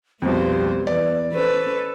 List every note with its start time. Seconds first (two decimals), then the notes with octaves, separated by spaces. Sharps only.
0.22 B1 F2 G3 A#3 B3 C5
0.87 E2 B4 D5
1.34 C#4 A4 B4 C5